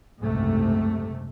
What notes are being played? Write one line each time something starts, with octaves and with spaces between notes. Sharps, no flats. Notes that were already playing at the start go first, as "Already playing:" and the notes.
F#1 C2 G#2 C3 A3